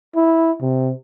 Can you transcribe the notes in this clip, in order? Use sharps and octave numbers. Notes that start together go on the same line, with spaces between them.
E4
C3